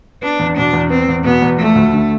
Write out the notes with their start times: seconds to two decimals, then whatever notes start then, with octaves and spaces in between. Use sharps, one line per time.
0.22 B3 D4
0.39 E2
0.57 B2 D4
0.73 E2
0.90 B3 C4
1.08 E2
1.25 B2 B3
1.42 E2
1.59 F3 A3
1.75 D2
1.93 D3